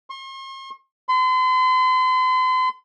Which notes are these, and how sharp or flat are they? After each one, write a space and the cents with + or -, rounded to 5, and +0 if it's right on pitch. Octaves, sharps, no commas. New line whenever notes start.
C6 +45
C6 -40